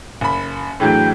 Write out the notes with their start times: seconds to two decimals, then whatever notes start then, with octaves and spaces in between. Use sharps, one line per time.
0.21 F#1 B5
0.80 A2 E3 F#3 A3 D4 G#4 G5